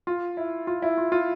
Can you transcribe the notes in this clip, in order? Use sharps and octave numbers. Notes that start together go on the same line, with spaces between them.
F4
E4
F4
E4
F4
F4